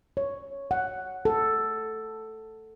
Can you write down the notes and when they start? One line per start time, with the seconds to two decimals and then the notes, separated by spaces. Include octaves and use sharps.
0.17 C#5
0.71 F#5
1.25 A4